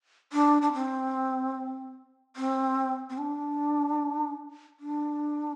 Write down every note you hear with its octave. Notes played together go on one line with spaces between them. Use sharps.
D4
D4
C4
C4
C4
D4
D4